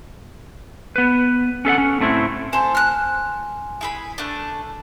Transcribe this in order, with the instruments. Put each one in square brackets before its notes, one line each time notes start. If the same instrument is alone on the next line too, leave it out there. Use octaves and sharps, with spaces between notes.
[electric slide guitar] B3 B4
C#4 A4 E5 F#5
C#4
A2 A3 C4 E4
[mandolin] A4 C5 [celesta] G#5 C6
[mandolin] F6 F#6
E4 G#4 B5
A3 D4